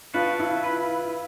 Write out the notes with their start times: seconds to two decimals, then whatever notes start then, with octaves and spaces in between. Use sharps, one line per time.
0.14 B3 D4 F4 F#4 B4
0.39 E4
0.64 B4